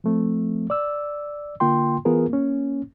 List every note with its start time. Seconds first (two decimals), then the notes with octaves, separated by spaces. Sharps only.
0.04 F3 A3 C4
0.70 D5 E6
1.60 D3 A#3 F4 G5 C6
2.05 E3 B3 F4 G#4 A#4
2.30 A#3 C#4